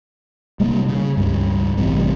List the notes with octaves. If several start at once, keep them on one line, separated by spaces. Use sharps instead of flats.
C3 G3 A#3
C#3
C#2 G2
A1 C3 G3